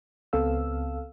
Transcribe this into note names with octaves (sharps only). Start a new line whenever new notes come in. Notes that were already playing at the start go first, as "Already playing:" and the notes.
C#2 B3 C4 A4 F5 E6